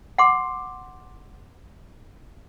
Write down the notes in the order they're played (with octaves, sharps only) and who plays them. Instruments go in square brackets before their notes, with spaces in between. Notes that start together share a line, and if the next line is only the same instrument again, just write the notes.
[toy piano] F#5 C6 D6